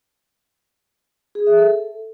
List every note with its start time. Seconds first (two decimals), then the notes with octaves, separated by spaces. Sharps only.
1.35 G#4
1.47 E5
1.58 A4